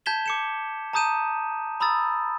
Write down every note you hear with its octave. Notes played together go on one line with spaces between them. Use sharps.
A5 G6 G#6 B6 E7 G7
D6 C#7 E7
A5 A#5 D#6 G6 D#7 E7
A#5 B5 D#6 E6 A6